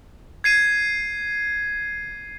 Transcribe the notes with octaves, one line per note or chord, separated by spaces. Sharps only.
G#6 C7 D#7